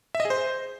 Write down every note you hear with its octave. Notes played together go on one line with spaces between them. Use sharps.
E5
D#5
G#4
C5